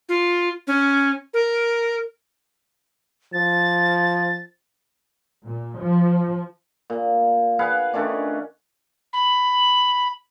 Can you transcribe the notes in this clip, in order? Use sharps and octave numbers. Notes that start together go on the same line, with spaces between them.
F4
C#4
A#4
F3 A6
A#2
F3
A#2
G#4 B4 F5 F#5
D#3 A3 C#4 D4
B5